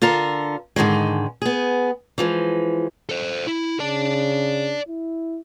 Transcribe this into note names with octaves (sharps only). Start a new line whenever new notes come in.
D3 F4 A4 A#4
G#2 D3 D#3 G#3
B3 G#4
E3 F3 G#3
A4 C5
E4
C#3 D5 A5
E4